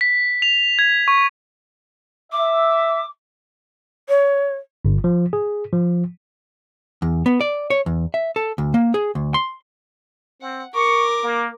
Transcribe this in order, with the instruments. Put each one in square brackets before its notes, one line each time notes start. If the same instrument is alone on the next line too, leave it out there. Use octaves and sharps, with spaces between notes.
[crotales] B6
F7
G#6
C#6
[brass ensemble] E5 [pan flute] D6
[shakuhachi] C#5
[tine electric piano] G1
F3
G#4
F3
[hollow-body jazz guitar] E2
B3
D5
C#5
E2
E5
A4
D2
A#3
G#4
D2
C6
[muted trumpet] C4 [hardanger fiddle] F#5
[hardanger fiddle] A#4 D6 [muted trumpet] C#6
[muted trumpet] A#3